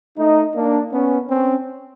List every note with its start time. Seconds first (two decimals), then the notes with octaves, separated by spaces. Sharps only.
0.18 A3 D#4
0.54 A#3 D4
0.92 B3 C#4
1.29 C4 C#4